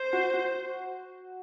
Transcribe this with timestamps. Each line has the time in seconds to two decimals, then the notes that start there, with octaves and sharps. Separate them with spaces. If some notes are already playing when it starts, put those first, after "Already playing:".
Already playing: C5
0.13 F#4
0.34 F#4